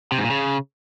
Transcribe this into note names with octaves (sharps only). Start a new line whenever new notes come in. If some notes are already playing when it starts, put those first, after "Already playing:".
C3
G#2
A#2
C#3